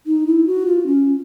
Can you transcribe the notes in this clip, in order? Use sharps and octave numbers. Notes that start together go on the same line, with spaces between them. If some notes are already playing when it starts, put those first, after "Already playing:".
D#4
E4
F#4
F4
C#4